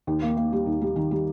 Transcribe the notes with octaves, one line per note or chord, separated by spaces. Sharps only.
D#2
A#3
A#3
G3
D#2
G3
D#3
G3